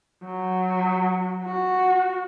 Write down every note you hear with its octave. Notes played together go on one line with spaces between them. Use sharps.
F#3
F#4